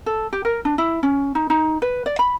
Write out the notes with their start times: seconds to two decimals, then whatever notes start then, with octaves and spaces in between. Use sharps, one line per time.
0.06 A4
0.33 G4
0.45 A#4
0.65 D4
0.78 E4
1.03 C#4
1.35 D#4
1.50 D#4
1.82 B4
2.06 D5
2.19 B5